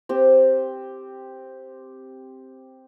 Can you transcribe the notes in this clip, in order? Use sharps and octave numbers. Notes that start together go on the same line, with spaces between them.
C4 G4